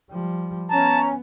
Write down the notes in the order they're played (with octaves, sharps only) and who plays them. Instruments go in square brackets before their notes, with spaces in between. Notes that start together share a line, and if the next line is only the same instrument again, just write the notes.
[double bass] F3 G3
[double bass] B3 [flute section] C#4 [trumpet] A5 [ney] A#5